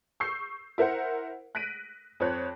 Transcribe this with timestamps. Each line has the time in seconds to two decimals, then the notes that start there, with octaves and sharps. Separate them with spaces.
0.20 C#6 E6 G6 C7
0.78 E4 A#4 C5 F#5
1.55 F#6 A#6 B6 D7 D#7
2.20 F2 C5 C#5 F#6